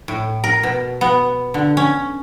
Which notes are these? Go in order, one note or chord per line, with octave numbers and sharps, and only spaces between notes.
A2
A#4
B2
B3
D3
C#4